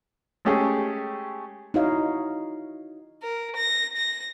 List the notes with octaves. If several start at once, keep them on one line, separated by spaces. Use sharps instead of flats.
G#3 A3 C#4 G4 G#4
D#4 E4 F#4 C#5 D#5 F5
A#4
A#6
A#6